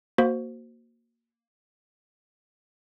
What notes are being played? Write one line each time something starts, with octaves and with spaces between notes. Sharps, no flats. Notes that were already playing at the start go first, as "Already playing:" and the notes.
A#3 F#4 C5